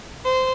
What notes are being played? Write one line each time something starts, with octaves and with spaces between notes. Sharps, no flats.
C5